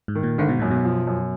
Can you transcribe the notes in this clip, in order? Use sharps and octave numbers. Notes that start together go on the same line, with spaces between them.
G#2
D#3
A#2
G#1 D3
B2
F#2 A#2
B2
F3
F#2